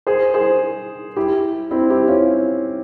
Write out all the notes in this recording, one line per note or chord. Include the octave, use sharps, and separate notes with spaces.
G#4 C5
G#4 C5
E4 G4
C4 E4
E4 G4
C#4 F4